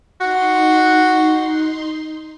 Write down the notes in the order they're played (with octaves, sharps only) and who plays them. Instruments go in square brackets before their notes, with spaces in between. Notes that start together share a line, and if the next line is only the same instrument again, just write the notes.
[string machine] D#4 C6 [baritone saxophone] F#4